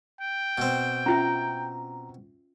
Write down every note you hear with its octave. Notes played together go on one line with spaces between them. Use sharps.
G5
B2 C4
C#4 F4 E5 A#5